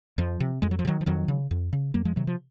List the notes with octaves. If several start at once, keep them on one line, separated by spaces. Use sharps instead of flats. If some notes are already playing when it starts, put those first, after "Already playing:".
F2 F3
C3
F2 G#3
F#3
F3
C3
D#3 F#3
F3
F2 D#3 F#3
C#3
F2
C#3
F2 F#3 A#3
F3 G#3
C3 D#3 F#3
F3